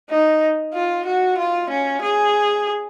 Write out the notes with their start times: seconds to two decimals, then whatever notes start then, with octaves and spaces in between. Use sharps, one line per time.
0.10 D#4
0.74 F4
1.05 F#4
1.38 F4
1.70 C#4
2.02 G#4